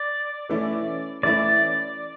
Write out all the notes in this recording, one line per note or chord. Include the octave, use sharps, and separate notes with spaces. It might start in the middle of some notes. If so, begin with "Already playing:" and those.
Already playing: D5
E3 A3 C#4 E4
E3 A3 C#4 E4 D5